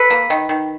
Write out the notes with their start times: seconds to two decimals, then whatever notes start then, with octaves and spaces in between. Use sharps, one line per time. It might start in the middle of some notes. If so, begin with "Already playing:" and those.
Already playing: A4 B4
0.10 A#3
0.30 D#3
0.49 D#3